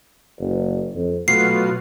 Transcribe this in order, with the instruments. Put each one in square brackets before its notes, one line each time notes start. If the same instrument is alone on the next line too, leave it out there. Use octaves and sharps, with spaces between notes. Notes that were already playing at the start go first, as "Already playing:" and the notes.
[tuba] F#1
F2
[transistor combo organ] B2 F#3 F4 [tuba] A3 [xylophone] C7